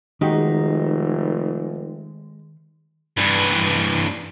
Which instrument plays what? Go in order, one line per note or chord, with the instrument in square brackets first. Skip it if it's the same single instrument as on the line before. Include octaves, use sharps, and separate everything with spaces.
[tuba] F1 [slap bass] D#3 [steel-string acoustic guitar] G#3 [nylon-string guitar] D#4 F#4 G4
[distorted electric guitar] G2 E3